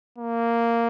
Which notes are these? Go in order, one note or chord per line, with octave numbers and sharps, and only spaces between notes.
A#3